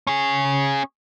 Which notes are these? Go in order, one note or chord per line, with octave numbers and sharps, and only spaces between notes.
C#4 G#4